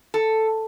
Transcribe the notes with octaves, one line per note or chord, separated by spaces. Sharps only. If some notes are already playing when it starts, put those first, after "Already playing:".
A4